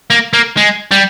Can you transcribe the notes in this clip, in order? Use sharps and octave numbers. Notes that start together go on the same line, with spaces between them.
A#3
A#3
G#3
G3